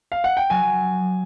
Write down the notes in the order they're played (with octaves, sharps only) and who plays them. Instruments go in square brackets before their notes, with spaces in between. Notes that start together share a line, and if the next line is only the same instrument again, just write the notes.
[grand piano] F5
F#5
G5
[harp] F#3 [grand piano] G#5